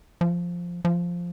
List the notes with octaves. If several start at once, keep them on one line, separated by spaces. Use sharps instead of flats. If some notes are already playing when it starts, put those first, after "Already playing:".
F3
F3